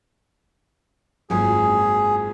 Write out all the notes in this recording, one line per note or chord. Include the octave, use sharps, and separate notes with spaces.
G#1 F#2 A#2 G#4